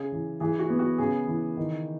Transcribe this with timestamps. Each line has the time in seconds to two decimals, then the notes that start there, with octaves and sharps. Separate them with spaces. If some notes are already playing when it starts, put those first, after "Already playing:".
Already playing: C#3 G#4
0.12 E3
0.40 E3 G#4
0.59 F#4
0.70 B3
0.79 F#4
0.98 C#3 G#4
1.27 E3
1.57 D#3